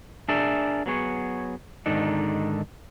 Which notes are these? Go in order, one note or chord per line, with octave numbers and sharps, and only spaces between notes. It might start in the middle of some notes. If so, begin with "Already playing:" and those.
D4 G#4 A#4 D5 E5
F#3 B3 G#4 C#5
G#2 D3 D#3 D4 D#4